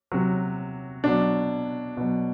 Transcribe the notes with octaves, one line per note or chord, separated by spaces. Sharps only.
C3 F#3
B2 F#3 D4
B2 F#3